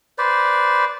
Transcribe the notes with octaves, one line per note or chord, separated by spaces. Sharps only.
B4 C5 D5